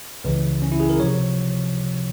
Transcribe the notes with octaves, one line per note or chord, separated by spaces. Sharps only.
C#2 C#3 E3
C#4
E4
G#4
A#4
C3 F3 C#5